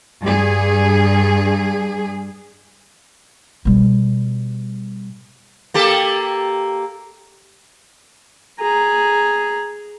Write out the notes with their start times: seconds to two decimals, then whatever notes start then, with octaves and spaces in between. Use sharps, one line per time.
0.21 G2 G3 G#4
3.65 B2 G3
5.74 A#3 G4 A4
8.59 G#4 A#5